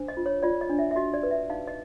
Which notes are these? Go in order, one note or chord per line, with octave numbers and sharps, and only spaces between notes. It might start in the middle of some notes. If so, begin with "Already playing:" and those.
Already playing: D4 C5
D#5
F4
C#5
F4 D5
D#5
D4
E5
E5
F#4 D#5
D5
B4
E5
D#4 F5
D#5